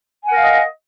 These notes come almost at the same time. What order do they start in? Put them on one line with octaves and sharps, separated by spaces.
G#5 F#5 A#4 F5 D#5